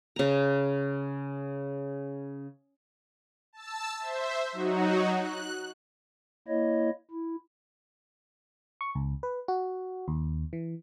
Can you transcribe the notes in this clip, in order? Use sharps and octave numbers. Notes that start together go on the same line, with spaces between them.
C#3 A#5
A5 E6
C5 E5
F#3 D#4 F#4
F#6
A#3 E4 C#5 D#5
E4
C#6
C#2
B4
F#4
D#2
E3